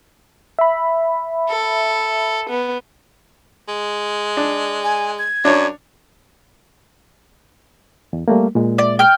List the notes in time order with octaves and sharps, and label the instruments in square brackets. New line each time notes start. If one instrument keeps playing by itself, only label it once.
[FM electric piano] E5 B5
[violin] A4
B3
[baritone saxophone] G#3
[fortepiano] D4
[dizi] G#5
G#6
[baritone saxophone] F#2 [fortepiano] D4 C#5
[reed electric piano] E2
G3 A3 A#3
A#2 G#3
[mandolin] D5
G5 F6